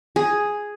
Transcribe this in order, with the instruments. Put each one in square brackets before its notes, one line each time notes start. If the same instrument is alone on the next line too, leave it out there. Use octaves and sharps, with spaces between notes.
[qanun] G#4